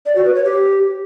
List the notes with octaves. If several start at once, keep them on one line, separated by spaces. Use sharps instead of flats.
D5
F#4
B4
C#5
G4